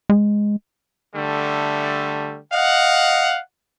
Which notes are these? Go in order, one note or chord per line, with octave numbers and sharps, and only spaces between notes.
G#3
D3 G3 A3
D#5 F5 F#5